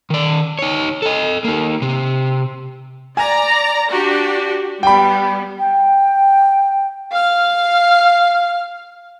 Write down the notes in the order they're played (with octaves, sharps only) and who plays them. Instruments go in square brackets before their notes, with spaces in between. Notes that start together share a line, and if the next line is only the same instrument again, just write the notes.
[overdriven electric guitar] D#3 D5
D#4 C#5
A4 D#5
A#3 D#4
C3
[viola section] D5 A#5 [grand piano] G#5
[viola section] D4 F#4 G4
[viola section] G3 B3 [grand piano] G5 B5
[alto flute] G5
[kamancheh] F5 F6